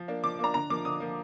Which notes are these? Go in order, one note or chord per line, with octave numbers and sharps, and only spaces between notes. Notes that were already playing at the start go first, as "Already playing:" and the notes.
Already playing: F3
A#3 D4
F3 D6
A#3 D4 A#5
D3 A#5
F3 A#3 D6
D3 D#6
F3 A#3